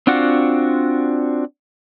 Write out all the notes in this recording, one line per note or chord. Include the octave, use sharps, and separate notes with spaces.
C4 D4 F4 F#4 F#5